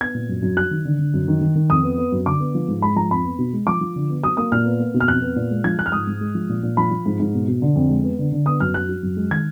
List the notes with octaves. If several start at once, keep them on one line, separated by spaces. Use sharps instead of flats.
B3 G#6
A#2
F#2
F#2
F#3 F#6
D#3
D3
D3
F#2
D#3
D#3
D#3
F2 D#6
B3
B3
F#2
D3 D6
B3
F3
G#2
G#3 B5
F3 A#5
F2 B5
B3
B2
G#3
F3 D6
F3
D3
B3
F#3 D#6
A#3 D#6
A#2 F6
B3
A#3
B2
F6
F2 F#6
B3
A#2
G#3
F3 G#6
F3 F#6
F6
G#2 D#6
G#2
G#3
F3
A#2
A#2
F3 B5
F3
G#2
G#2
B2
B2
D3
F2
G#3
B3
D3
D3
B3 D#6
F#2 F6
F#3 F#6
F#3
F#2
G#3
D#3 G#6